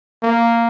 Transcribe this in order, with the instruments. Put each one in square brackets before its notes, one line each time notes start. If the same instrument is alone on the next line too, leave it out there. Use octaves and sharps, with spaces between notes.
[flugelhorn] A#3